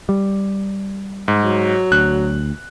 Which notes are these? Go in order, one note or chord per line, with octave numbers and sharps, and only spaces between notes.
G3
G#2
F#3
D2 F#6